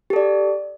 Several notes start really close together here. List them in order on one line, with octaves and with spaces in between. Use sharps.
G4 A4 D5